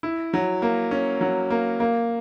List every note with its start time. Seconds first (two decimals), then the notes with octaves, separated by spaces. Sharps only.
0.03 E4
0.34 F#3
0.62 A#3
0.91 C#4
1.21 F#3
1.50 A#3
1.80 A#3